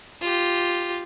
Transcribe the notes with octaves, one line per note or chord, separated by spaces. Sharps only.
F4 G4